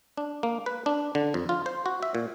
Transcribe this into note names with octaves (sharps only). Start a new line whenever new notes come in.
D4
A#3
B4
D4
D3
F2
F4
C5
F#4
E5
A#2